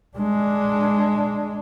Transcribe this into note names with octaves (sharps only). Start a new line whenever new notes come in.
G#3 D4